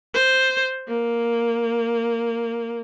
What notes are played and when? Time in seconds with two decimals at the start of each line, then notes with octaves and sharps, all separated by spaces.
0.14 C5
0.88 A#3